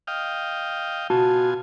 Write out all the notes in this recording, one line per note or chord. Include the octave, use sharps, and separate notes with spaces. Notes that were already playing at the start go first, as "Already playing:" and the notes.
D#5 F5 G5
B2 F4 F#4 G#5 A5